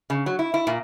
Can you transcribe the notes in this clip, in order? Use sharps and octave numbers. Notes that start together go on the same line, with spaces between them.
C#3
F#3
E4
E4
A#2